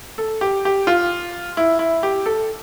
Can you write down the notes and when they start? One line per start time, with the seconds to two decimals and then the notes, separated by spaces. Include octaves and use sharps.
0.18 A4
0.41 G4
0.65 G4
0.87 F4
1.57 E4
1.79 E4
2.03 G4
2.26 A4